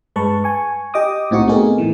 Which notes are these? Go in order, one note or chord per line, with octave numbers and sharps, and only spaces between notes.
G2 G#3 B4 A5 C#6
G#5 C#6
G4 D#5 G5 D6 D#6
C2 A2 C4 D#4 F#4 C#6
A3 B3 C4 D#4 G#4 A#4
A2 D#3 E3